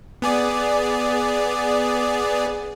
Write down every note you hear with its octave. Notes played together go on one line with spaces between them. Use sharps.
B3 G#4 D5